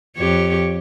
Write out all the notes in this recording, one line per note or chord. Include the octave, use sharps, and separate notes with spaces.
F2 G4 C#5